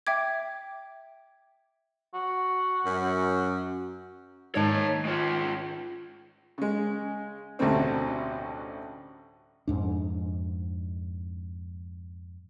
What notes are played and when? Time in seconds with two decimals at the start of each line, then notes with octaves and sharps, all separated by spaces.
0.07 E5 G5 D6 G#6
2.14 F#4
2.85 F#2
4.55 G#2 D#3 D#4 C#5 A5
5.05 G#3 F4
6.58 C#3 G#3
7.59 A1 D2 B2 G3 A3 C4
9.68 F2 G#2 D4